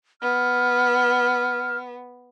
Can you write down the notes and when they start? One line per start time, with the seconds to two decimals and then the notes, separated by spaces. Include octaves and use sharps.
0.22 B3 F6